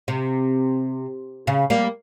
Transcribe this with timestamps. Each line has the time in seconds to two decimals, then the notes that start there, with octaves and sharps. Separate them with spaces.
0.08 C3
1.47 C#3
1.70 G3 A#3